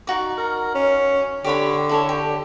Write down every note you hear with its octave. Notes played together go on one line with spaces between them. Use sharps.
D#4 F#4 D5
A#4
C#4
D3 G4 C#5 B5
E4 A4 C#5
G4